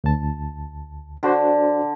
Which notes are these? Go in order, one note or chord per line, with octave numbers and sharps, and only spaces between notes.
D2 A5
D3 D4 F#4 C5